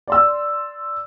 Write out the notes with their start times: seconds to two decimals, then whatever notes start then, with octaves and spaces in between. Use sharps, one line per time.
0.07 D5 C6 E6